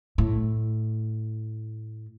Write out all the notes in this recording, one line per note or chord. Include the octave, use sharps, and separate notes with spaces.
A2